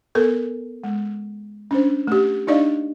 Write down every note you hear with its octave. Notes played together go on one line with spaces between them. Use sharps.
B3 A4 A#4
G#3
C#4 D4 C5
A3 G4
D4 D#4 D5 D#5 F5